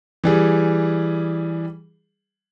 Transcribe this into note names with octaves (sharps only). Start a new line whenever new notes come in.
E3 G3 G#4